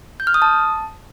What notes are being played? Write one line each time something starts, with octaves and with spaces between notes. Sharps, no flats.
G6
F6
D#6
A5